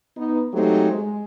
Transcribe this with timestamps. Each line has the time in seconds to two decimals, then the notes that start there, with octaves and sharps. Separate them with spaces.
0.17 B3 D#4
0.54 F#3 G#3 A3 C4 D#4 G4
0.92 G#3